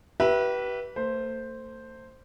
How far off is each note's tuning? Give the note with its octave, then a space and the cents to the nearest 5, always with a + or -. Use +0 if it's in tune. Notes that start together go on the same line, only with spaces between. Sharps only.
G4 -40 B4 -20 E5 +0
A3 +40 C5 +0